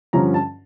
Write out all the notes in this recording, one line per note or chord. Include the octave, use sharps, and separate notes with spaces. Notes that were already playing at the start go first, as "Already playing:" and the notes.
G2 D3 F3 C#4 A#5
A5